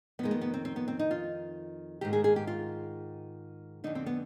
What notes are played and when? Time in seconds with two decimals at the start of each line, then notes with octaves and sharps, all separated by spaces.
0.19 F2 B3
0.23 D#3 G#3
0.31 B3
0.41 B3
0.54 C4
0.65 C4
0.76 B3
0.88 C4
0.99 D#4
1.11 F4
2.01 G#2 D#3 G4
2.13 G#4
2.24 G#4
2.36 G4
2.47 F4
3.84 F2 D3 D#4
3.95 C4
4.06 B3